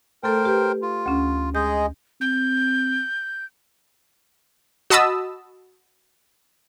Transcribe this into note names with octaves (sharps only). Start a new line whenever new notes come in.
A3 A4 A#4 C5 G5
G4 B4
F4
D2 C#4
G#3 G#4 D#5 G6
C4 G6
F#4 D#5 A5 B5 D#6 E6